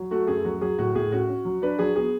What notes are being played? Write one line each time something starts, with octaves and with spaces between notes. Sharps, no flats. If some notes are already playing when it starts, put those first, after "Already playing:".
Already playing: F#3
A3 F#4
F#2 G#4
F#3 F#4
F#3 G#4
A2 F#4
A2 G#4
C#4 F#4
C#4
F#3
D4 B4
F#3 G#4
B3 G#4